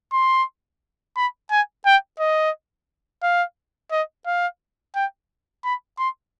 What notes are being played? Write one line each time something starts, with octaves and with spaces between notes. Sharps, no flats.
C6
B5
G#5
G5
D#5
F5
D#5
F5
G5
B5
C6